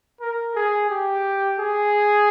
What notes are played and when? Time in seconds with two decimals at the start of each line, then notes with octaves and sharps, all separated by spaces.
0.21 A#4
0.55 G#4
0.90 G4
1.59 G#4